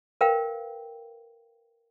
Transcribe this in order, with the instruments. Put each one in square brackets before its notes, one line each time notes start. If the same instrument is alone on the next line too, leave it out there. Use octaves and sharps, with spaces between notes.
[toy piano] A#4 B4 F5 G5